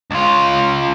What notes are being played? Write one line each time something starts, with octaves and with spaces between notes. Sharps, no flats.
C#2 F4